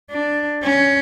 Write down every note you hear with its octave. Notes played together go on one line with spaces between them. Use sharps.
D4
C#4